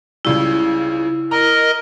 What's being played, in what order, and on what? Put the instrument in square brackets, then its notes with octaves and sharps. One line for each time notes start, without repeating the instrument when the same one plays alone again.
[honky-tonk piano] C#2 C#3 G3 [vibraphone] E4
[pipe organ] A#4 D#5 [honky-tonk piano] A#5